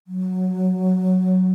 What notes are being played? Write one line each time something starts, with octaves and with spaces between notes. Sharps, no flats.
F#3